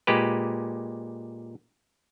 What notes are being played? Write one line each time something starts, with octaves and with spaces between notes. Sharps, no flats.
A#2 G#3 G4 B4